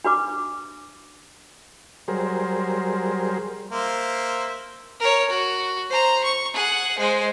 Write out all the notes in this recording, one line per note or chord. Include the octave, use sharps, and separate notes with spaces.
D4 F#4 B4 D6
F#3 G3 G#4 A#4 C5
A#3 C5 E5
A#4 C#5
F#4
C5 A#5
C#6
G#4 F#5
G#3 C5